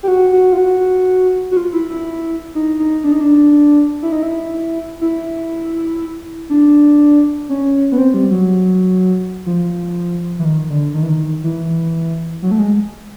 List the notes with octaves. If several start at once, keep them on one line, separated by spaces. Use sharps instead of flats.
G4
F#4
F#4
F4
F#4
F#4
F4
E4
E4
D#4
D#4
D4
D#4
D4
E4
D#4
E4
E4
D4
C#4
B3
C4
G3
F#3
F3
E3
D#3
D3
D#3
E3
D#3
E3
F#3
A3
G#3